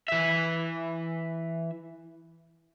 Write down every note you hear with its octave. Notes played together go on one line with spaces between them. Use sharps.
E3 E5